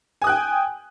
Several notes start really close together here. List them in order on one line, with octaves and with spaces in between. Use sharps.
G#5 D#6 F#6 G5